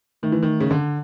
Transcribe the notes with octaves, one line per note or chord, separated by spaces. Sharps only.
D#3 A3
E3
D#3
C#3
D3